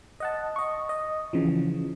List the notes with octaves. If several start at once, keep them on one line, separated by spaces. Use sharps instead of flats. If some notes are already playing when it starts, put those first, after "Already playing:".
D#5 F#5 A5
D#5 C#6
D#5
C#3 E3 F3